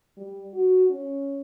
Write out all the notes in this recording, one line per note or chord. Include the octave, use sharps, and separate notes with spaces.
G3
F#4
C#4